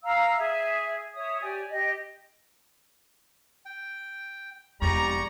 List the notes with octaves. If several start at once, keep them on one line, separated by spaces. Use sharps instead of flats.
F5 A#5 E6
G#4 E5
C#5 E5 D#6
G4 D5 G#5
G4 D#5
G5
E1 F2 G#2 G3 D5 A#5 C#6